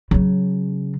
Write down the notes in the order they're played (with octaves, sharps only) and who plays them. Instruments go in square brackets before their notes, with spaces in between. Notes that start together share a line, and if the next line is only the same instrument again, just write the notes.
[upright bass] C#3 F#3